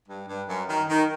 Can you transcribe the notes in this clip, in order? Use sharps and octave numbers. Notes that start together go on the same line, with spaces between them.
G2
G2
F#2
D#3
D#3